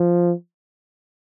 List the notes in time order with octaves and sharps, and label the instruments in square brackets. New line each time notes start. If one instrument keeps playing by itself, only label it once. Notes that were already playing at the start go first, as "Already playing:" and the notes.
Already playing: [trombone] F3